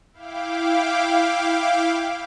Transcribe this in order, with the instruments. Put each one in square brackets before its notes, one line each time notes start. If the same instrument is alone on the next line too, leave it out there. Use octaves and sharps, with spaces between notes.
[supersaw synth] E4 F5 G5 D6